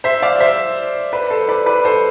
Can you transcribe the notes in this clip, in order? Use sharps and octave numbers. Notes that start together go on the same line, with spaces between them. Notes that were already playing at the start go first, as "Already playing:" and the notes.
C5 E5
D5 F5
C5 E5
B4 D5
A4 C5
B4 D5
B4 D5
A4 C5